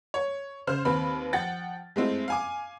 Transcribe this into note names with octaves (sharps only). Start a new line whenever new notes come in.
C#5
C#3 C5 F6
D#2 C4 B4 B5
F3 F#5 G5 A6
G#3 A3 C4 E4 F4
F5 G#5 D6